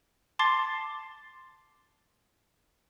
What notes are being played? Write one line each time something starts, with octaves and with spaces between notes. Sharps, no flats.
A5 C6 D6 A6 C7